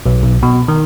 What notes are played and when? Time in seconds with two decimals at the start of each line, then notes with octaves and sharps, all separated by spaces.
0.06 B1
0.23 B1
0.43 B2
0.68 D#3